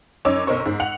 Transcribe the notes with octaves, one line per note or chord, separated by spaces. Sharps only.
F#2 D#4 C#5 D6 E6
B1 D#4 A#4 C5 C#6
G#2
F#5 F7